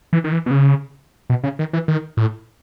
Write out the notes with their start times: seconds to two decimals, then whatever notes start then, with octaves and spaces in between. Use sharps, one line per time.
0.13 E3
0.24 D#3
0.32 E3
0.46 B2
0.51 C#3
1.30 B2
1.44 C#3
1.59 D#3
1.73 E3
1.88 D#3
2.17 A2